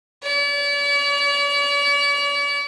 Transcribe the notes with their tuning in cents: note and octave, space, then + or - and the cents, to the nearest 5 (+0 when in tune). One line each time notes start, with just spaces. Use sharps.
D5 -45